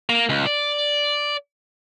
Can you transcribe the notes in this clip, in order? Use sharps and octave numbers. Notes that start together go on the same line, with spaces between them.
A#3
C#2
D5